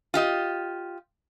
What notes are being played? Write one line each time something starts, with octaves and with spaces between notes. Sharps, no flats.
F4 G4 D#5